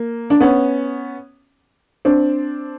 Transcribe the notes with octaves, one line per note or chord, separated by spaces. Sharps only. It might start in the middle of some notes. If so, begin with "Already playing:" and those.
Already playing: A#3
D4
B3 C#4
C4 D4